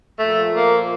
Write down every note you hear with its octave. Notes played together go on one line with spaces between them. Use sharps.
A#2 F3 A3
A#3